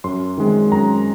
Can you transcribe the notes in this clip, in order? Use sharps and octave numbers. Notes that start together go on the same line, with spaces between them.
F#2 C6
D#3 G#3 C4
F#2 A#5